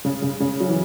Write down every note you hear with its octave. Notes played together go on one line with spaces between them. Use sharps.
C#3
C#3
C#3
F#3
E3